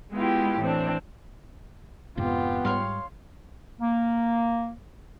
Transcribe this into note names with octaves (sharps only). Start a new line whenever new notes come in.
G#3 B3 E4 F4 G4
A2 E3 C4 D4
F2 G#2 C3 B3 F4 G4
G#2 G3 C#5 F5 C6
A#3